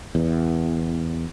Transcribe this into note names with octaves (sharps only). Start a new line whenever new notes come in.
E2